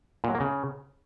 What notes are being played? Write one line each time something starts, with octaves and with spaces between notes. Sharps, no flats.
A#2
F#3
A#3
C#3